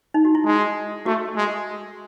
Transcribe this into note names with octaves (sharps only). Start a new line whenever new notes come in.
D#4
F#4
E4
G#3
A3 F#4
G#3